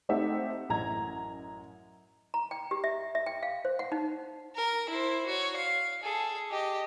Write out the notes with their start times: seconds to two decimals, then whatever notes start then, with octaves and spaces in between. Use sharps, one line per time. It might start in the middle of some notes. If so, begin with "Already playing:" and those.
0.09 A3 C4 D#4 G4 E5 F#5
0.69 A1 F#2 A#5 G#6
2.34 A#5
2.51 G5
2.71 G4
2.84 E5
3.15 E5
3.26 G5
3.43 F5
3.65 C5
3.79 F#5
3.92 D#4
4.56 A#4
4.89 E4 C5
5.27 F#4 C#5
5.56 F5
6.03 G#4 A4
6.51 G4 D#5